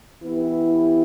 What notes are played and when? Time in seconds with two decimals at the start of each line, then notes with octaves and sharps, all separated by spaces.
0.22 E3 B3 E4 G4